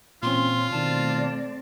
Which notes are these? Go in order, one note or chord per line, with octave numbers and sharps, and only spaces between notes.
A#2 E3 C4 C#4 F4 C6
B2 D#3 A3 C4 D5 A5